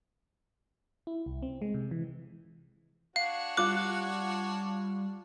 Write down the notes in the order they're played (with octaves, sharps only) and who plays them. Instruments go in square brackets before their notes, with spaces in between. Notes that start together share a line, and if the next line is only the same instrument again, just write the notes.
[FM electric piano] E4
C2
C4
G#3
C3
E3
[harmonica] D4 F#4 C#5 [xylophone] F5
[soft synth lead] G3 [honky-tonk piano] F4 F#6 [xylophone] D6